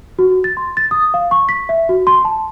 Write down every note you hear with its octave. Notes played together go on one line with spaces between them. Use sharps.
F#4
A6
C6
A6
D#6
F5
C#6
B6
E5
F#4
C6
A5